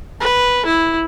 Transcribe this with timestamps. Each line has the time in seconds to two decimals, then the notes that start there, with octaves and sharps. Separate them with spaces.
0.20 B4
0.66 E4